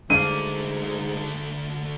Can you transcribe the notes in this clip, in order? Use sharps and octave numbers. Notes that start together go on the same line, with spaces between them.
G#2 D3 A3 D4 F5 D#7